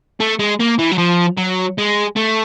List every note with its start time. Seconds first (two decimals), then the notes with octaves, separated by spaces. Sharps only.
0.20 A3
0.39 G#3
0.60 A#3
0.79 E3
0.91 F#3
0.98 F3
1.38 F#3
1.78 G#3
2.17 A3